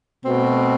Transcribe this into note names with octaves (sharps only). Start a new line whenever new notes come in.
B2 A3 C4